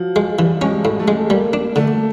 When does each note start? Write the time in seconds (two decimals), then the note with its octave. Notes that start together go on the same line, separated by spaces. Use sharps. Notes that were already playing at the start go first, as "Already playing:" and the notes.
Already playing: F3 F#3
0.16 G#3
0.39 E3 G3
0.62 G#3 C#4
0.70 G3
0.85 A2
1.00 A3
1.08 G#3
1.30 G3 A#3
1.53 D4
1.76 D3 A3